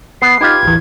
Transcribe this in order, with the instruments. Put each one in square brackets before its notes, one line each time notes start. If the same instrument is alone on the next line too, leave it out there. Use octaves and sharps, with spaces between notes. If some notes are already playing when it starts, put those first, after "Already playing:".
[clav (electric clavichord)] B3 [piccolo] C7
[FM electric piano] D#4 [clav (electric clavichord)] F4 G4 B4 [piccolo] G#6
[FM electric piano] A1 D#2 E3